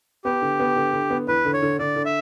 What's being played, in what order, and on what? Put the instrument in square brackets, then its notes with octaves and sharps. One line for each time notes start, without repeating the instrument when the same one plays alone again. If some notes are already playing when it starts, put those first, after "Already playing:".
[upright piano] B3 [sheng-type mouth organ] G4
[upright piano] D3
B3
D3
D3
B3
[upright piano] E2 [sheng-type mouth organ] B4
[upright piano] D3
[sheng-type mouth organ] C#5
[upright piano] D3
[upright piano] D3 [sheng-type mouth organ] D5
[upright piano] D3
[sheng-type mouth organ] E5